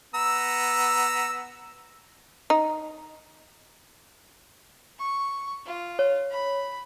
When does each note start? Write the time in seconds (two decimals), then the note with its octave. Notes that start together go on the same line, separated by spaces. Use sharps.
0.15 B3 A#5 E6
2.50 D#4
4.99 C#6
5.66 F4
5.99 C#5
6.31 B5